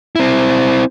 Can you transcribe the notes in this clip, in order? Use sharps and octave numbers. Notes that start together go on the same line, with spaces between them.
C4 E4